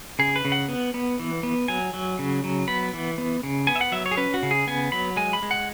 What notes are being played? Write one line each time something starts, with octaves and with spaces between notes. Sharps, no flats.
C#3 G#4
B4
C#3
F#5
B3
B3
E3
B3
F#3 G#5
F#3
C#3
F#3
B3 B5
E3
B3
C#3
B3 G#5
E5
F#5
F#3 E5
C#5
G#4
C#4 B4
F#4
C#3
G#4
B3 G#5
F#3 B5
G#3 G#5
B5
G#3
F#5